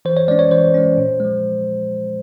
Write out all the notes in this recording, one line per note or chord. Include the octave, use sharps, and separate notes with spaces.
E3 C5
C#5
G#3 C#4 D5
C#5
E3 C5
G#3 C#4
A#2
F3 G#3